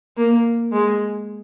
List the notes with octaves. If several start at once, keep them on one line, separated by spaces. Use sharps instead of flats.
A#3
G#3